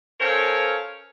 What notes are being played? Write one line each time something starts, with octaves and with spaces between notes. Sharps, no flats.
C#4 A4 A#4 C5 C#5 F5